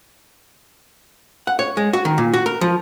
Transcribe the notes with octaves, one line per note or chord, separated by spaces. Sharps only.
F#5
C#5
G#3
F#4
D#3
A#2
F#4
A#4
F3